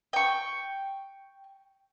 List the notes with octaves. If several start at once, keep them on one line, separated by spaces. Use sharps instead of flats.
G5 C#6